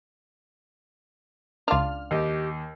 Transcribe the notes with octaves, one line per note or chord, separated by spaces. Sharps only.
C#2 D4 F4 F6
D#2 G4 D#5